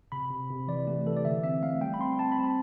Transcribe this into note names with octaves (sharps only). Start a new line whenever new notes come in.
C3 B5
C3
C3
E3 D5
A3 G4
E3 A4
D5
D3 E5
C4 E5
A3 F5
G3 G5
B5
C4 C6
C4 A5
B5
C4
A5